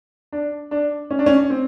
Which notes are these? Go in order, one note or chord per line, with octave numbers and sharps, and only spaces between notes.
D4
D4
C#4
D4
C#4
C4